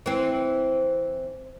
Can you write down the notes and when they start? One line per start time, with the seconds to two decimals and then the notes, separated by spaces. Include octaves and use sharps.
0.06 E3 C4